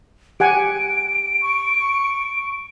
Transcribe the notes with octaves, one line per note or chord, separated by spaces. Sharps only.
G4 F#5 G#5 D7
C#6